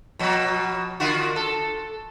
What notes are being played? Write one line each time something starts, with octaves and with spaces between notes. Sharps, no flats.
B2 F3 F#3
D3 F4 F#4
A4